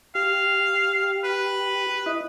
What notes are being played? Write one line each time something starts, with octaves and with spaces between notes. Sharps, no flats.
G4 F5
B4
E4 D#5